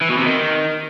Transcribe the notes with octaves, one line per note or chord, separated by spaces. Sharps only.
E3
B2
C3
D#3